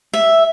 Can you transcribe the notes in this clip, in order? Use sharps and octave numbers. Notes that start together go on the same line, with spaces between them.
E5